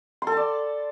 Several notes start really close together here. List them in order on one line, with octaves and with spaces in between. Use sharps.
C6 A4 A5 D5